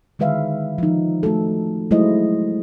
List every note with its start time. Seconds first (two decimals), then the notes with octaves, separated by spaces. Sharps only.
0.19 D3 D#3 G#3 B4 E5 F5
0.78 F3 G#3 D#4
1.23 A3 F#4 A4
1.91 F#3 G#3 A3 E4 C5 D#5